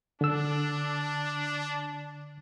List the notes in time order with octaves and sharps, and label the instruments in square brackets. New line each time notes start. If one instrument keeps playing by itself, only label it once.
[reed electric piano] D3 E6 [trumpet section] D4